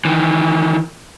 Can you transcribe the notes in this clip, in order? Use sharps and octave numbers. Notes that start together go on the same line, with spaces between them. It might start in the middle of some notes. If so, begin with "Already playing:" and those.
D#3 E3